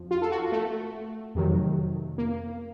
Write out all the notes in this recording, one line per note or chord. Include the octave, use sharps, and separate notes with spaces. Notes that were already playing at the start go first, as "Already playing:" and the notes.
Already playing: F2 F3
F4
A4
F#4
A3
F2 C3 D#3 F#3
A#3